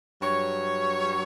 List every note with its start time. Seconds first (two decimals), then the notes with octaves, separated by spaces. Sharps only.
0.22 G2 F#3 C#5